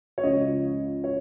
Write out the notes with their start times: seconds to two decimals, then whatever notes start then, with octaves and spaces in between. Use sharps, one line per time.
0.18 C#5
0.23 C#2 C#3 F3 D#5
1.04 C#5